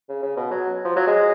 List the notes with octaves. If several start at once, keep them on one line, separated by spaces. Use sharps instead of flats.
C#3
C#3
B2
F#3
F3
F#3
G#3